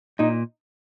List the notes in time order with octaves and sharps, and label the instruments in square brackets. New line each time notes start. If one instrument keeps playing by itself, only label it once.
[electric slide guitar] A#2 [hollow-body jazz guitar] D#4